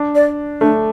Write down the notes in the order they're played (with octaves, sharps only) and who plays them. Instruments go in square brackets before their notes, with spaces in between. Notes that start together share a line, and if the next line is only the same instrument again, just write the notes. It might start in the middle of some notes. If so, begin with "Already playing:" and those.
Already playing: [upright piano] D4
[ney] D5
[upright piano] A3 [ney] D4